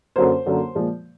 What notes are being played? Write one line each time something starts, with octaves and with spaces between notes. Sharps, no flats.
F#2 D3 F#3 A#3 C5
F#2 D3 F#3 A#3
A#2 F3 G#3